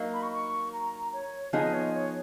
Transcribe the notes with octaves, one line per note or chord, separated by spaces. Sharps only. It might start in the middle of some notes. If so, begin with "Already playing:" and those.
Already playing: F#3 A#3 D#4
B5
C#6
C#6
A#5
C#5
F3 B3 D#4 G#4 D#5
C#5
C#5